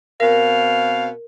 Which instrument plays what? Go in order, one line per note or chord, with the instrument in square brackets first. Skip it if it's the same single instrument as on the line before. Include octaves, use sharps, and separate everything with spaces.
[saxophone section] B2 C4 F5 [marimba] A#4